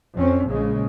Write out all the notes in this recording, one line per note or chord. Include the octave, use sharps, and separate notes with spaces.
F2 C4 C#4
A#1 C#3 G#3